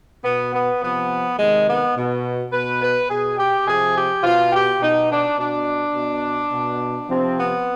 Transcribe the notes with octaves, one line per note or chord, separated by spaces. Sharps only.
B2 B3
B3
C3 F3 B3
C3 D#3 G#3
B3
B2
B2 B4
B4
B2 G#4
G4
C3 F3 G#4
G4
B2 F4
G4
B2 D#4
D4
B2 D4
B2
B2
C3 F3 C4
B3